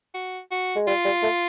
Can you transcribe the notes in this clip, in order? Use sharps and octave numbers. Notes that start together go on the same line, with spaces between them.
F#4
F#4
G#3
G3 F4
G3
A3